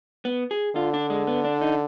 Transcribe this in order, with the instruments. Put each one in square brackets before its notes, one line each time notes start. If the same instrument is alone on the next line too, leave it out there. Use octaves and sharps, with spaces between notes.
[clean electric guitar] B3
G#4
[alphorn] D3 [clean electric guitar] F4
[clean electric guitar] D4
G#3
B3
D4
D#4